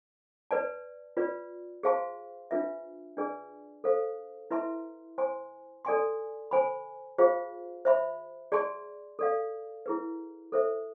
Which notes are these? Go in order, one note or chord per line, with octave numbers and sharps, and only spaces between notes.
B4 D5 A5
F4 B4 D5
G#4 C5 F5 A5 C6
D4 F4 B4 E5
D4 G#4 B4 D5 G#5
A4 C5 F5
E4 B4 E5 A5 C6
C5 G#5 C6
A4 D5 G#5 C6
C5 G#5 B5
F4 G#4 C5 F5
C5 E5 B5
G#4 D5 A5 C6
A4 D5 F5
E4 G#4 B4
A4 C5 E5